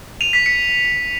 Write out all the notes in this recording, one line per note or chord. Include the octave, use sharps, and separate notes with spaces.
D#7 F7
B6
B6 C#7